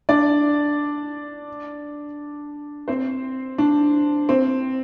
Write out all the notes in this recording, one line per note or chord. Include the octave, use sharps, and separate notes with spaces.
D4 D5
C4 C5
D4
C4